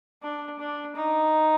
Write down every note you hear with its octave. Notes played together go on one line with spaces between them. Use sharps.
D4
D4
D#4